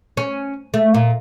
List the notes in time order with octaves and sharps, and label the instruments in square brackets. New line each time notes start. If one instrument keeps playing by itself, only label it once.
[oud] C#4
A3
A#2